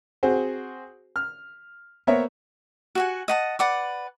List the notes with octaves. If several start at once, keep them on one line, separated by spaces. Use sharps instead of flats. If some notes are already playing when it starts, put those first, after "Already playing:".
C4 F#4 G#4 C5
F6
A#3 B3 A#4 C5 C#5 E5
F#4 F#5 G#5
D#5 F#5 A5
B4 D5 F#5 D6